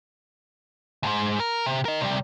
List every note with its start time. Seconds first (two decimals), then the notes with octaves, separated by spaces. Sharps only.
1.03 D2 G#2
1.40 A#4
1.66 C3
1.85 A#4 D#5
2.01 C3 G3